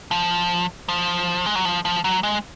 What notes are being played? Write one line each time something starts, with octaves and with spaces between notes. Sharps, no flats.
F3
F3
G#3
F#3
F3
F3
F#3
G#3